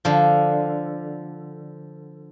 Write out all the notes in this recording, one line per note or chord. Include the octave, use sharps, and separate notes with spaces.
D3 F3